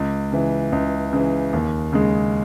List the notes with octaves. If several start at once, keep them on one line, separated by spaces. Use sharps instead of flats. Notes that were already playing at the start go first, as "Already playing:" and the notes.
Already playing: C#2
C#3 E3
C#2
C#3 E3
D#2
C#3 G#3